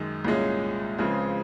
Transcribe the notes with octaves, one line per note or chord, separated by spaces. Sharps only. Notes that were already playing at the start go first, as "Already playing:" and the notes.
Already playing: F#2 D#3 G#3
C2 A#2 G#3 C#4
C#2 C#3 F3 G#3 C4